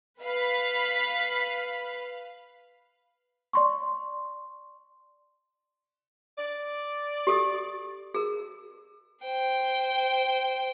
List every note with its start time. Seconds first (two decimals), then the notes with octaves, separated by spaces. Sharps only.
0.20 B4 F5 B5
3.53 D5 C6 C#6
6.38 D5
7.27 G4 A4 D#6
8.14 G#4 A#4
9.26 C5 G5